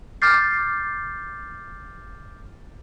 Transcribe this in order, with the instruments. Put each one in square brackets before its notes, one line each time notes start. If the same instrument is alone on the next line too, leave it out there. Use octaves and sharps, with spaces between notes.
[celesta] D6 F6 G6 A6 C7